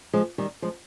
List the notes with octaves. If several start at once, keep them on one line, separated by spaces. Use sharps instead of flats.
F3 G#3
D#3 G3
F3 G#3